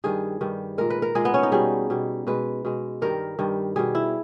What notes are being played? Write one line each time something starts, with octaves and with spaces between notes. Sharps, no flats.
G2 D#3 G3 G#4
G2 D#3 G3
A#2 G#3 A#4
B4
A#4
A#2 G#3 G#4
B3
C#4
D#4
B2 G3 G#4
B2 G3
B2 G#3 B4
B2 G#3
G2 D#3 G3 A#4
G2 D#3 G3
B2 G3 G#4
E4